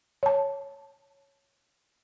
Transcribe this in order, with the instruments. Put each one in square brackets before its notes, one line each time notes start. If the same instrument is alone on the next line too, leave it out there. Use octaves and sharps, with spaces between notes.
[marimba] C#5 A5